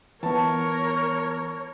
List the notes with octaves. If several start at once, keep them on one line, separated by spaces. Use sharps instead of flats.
E3 B3 A#4 C#5 A5